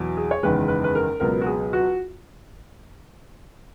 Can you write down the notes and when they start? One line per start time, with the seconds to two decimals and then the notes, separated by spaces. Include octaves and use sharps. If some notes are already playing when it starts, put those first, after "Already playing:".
Already playing: E2 B2 F#3
0.17 G#4
0.31 C#5
0.43 F#1 E2 D#3 G#3 B4
0.68 B4
0.84 B4
0.95 A#4
1.20 C#2 B2 F#3 B3 A#4
1.41 F#4
1.46 G#4
1.73 F#4